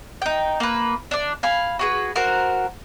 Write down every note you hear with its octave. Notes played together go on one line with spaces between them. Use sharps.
D#4 G5
A#3 B4
D4 D5
F5 G#5 B5
F#4 G#4 B4
F#4 A#4 C5